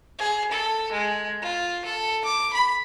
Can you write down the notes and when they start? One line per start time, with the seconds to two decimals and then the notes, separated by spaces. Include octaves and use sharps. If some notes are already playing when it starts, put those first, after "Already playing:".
0.19 G#4
0.52 A4
0.92 G#3
1.42 F4
1.85 A4
2.25 D6
2.53 B5